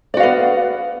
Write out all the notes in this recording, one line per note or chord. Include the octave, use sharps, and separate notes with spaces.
B3 F#4 D5 F5